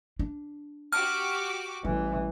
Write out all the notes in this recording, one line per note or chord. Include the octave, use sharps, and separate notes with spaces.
D4
F#4 G4 D6 F6
A1 E3 G3